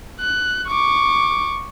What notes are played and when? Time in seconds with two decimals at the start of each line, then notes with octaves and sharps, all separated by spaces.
0.20 F#6
0.68 C#6 D6